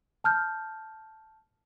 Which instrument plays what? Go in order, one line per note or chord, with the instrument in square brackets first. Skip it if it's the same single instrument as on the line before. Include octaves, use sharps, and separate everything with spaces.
[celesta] A5 F6 G6